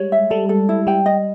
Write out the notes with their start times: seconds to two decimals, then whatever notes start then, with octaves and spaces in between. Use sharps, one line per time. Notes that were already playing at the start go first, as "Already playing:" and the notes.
Already playing: G3 G#3 C#5
0.12 E5
0.30 G3 A4
0.49 A4
0.69 E4
0.87 G3 G5
1.06 D#5